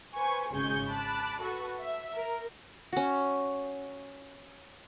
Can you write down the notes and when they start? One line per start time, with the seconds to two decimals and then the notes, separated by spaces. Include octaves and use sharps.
0.15 B4 C5 G#5 C#6
0.51 G#1 C#3 G#3 G#5 C#6 G6
0.88 A5 B5 D6 F#6
1.41 F#4 A4 B4
1.80 E5
2.15 A#4
2.93 C#4 F#4